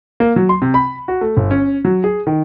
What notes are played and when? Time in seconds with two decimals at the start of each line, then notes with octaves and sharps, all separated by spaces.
0.20 A#3
0.36 F#3
0.49 C6
0.62 C3
0.74 B5
1.08 F#4
1.21 A3
1.37 G1
1.51 C#4
1.85 F#3
2.04 G#4
2.27 D#3